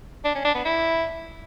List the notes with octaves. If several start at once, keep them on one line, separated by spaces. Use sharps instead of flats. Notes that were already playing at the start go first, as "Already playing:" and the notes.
D4
C#4
D4
B3
E4